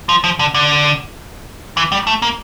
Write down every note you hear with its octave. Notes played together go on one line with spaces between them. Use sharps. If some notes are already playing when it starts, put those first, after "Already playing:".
F3
F3
D3
D3
E3
G3
A3
A#3